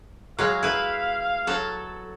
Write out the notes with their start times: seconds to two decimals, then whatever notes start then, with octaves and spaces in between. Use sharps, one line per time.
0.39 F#3 G#3 F5
0.63 E4 B4
1.47 F#3 A4